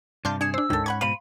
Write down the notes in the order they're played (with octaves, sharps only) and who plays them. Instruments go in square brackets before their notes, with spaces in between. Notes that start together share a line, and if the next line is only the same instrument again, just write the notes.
[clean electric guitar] G2 C3 [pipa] D4 F4 [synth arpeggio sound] C6 F6 G6
[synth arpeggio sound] D4 C#7 E7 [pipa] G#4 [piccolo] G#6
[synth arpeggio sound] D4 C5 [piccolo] E6
[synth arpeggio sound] D2 [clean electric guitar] G#2 C#4 [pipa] D#3 A4
[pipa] F#5 B5 C#6 [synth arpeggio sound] G#6
[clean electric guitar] G#2 B2 [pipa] C5 B5 [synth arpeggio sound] F5 [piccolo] D#7